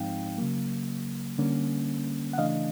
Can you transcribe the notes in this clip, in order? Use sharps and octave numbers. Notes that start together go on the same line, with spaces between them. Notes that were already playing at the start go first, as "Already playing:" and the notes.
Already playing: G#2 F3 G#3 C4 D#4 F5 G5
C#3 F#3 A#3
D3 G3 A#3 C#4
F#5
C#3 E3 A3 D4 D#5 F5